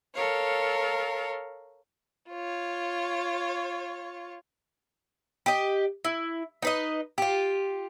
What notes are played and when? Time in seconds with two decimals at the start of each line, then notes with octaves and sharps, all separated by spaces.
0.14 A4 A#4 C#5 F5
2.30 F4 C#5
5.46 G4 D#5
6.04 E4
6.62 D#4 B4 D#5
7.18 F4 G4